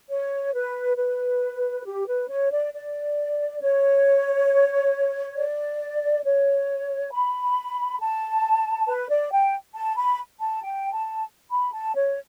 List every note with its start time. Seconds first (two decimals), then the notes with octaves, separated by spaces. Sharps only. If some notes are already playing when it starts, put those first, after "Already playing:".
0.09 C#5
0.54 B4
0.97 B4
1.85 G4
2.07 B4
2.29 C#5
2.51 D5
2.73 D5
3.61 C#5
5.36 D5
6.24 C#5
7.12 B5
8.00 A5
8.87 B4
9.09 D5
9.32 G5
9.75 A5
9.96 B5
10.41 A5
10.63 G5
10.93 A5
11.51 B5
11.73 A5
11.95 C#5